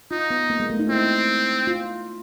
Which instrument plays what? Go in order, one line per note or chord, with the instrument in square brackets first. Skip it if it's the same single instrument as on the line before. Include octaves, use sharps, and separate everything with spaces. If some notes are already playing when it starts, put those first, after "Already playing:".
[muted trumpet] D#4 [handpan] F4
[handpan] B3
A#3
G#3
A3
D#4
[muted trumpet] C4 [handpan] E4
[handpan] F4